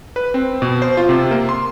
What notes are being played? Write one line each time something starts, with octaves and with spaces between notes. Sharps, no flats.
B4
C4
B2
C5
F4
C3
A#3
C6